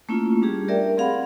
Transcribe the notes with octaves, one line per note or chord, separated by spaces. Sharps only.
A3 A#3 C#4 E4 F4
G3 D4 G4 G#4
G4 A#4 D5 E5 G5
C4 G#4 F5 F#5 B5